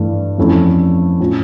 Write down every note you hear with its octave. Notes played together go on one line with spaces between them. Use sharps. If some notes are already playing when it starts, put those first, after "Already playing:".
Already playing: G2 E3 A3
F2 E3 A3 C#4 E4
A2 F3 C#4